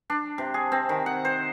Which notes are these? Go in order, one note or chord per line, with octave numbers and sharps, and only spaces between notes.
D4
C3
G#4
C4
D#3
F#5
C5